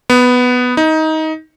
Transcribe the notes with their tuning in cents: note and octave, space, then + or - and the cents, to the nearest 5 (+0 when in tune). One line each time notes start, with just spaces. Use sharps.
B3 +5
D#4 +20